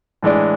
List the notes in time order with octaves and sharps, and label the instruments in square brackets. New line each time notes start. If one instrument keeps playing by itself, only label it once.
[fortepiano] A2 E3 G#3 D4